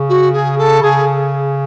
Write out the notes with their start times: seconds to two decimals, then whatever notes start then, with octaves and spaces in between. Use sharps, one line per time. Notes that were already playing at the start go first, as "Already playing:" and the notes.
Already playing: C#3
0.09 F#4
0.33 G#4
0.58 A4
0.82 C#3 G#4